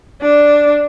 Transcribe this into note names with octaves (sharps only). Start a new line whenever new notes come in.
D4